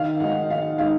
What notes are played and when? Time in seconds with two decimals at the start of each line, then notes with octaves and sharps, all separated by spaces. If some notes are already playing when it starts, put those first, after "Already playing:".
Already playing: D#3 F5
0.20 G#3 D#4 F#5
0.49 D#3 F5
0.78 G#3 D#4 F5